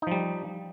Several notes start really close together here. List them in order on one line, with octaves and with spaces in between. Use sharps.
D#4 F3 G3